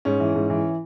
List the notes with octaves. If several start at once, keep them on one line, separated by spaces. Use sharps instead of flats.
G#2 C#4
E3
G#2
E3